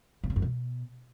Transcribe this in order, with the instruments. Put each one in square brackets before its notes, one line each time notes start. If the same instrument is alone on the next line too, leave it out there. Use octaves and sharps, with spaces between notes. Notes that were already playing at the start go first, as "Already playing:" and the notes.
[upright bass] A2
C#3
F#2
B2